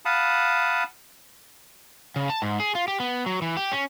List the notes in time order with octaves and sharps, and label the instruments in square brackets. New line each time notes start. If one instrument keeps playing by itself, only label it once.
[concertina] F5 F#5 A5 B5 D#6
[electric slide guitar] C#3
A5
G#2
G#4
F4
G4
B3
F#3
E3
G4
C#4